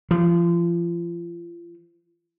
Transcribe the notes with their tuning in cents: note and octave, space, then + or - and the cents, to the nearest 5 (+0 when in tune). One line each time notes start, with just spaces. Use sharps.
F3 -35